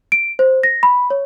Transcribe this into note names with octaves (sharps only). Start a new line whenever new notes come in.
D7
C5
A#6
B5
C#5